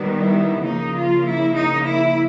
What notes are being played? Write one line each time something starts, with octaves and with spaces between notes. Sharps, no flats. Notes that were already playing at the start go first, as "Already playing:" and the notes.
Already playing: D#3 G3 B3
E4
C#3 F3 A#3 D#4
F4
E4
D#4
E4